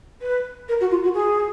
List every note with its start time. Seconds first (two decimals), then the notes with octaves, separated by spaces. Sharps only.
0.21 B4
0.68 A#4
0.80 F#4
0.91 F4
1.03 F#4
1.14 G#4